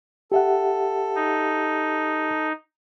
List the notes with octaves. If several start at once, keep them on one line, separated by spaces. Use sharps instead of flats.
G4 A4 E5 F#5
D#4